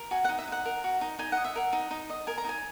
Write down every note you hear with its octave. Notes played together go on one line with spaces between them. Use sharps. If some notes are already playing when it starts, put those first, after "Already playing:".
Already playing: A#4
F#4 G#5
F#5
D#4
E5
D#4 F#5
A#4
F#4
D#4
D#4 G#5
D#5 F#5
E5
A#4 F#5
D#4
D#4
D#5
A#4 G#5
A#5
D#4 G#5